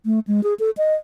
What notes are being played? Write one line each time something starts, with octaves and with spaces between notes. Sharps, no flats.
A3
G#3
G#4
A4
D#5